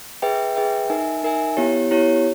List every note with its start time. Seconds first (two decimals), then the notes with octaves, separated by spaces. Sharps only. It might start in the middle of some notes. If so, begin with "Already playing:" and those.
0.22 G#4 B4 E5 G5
0.56 G#4 B4 E5 G5
0.90 D#4 A#4 E5 G#5
1.23 D#4 A#4 E5 G#5
1.57 B3 E4 G4 C#5
1.91 B3 E4 G4 C#5